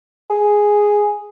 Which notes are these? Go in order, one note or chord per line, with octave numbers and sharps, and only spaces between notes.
G#4